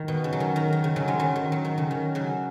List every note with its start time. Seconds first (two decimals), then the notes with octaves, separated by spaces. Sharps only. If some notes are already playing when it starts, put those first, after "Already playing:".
Already playing: D#3
0.08 B2
0.24 C#3
0.33 F#3
0.40 D#3
0.56 D#3
0.73 D#3
0.84 C#3
0.96 C#3 F#3
1.08 D#3 G#3
1.19 C#3 F#3
1.36 D#3
1.52 F#3
1.65 D#3
1.78 C#3
1.91 D#3
2.15 C#3 F#3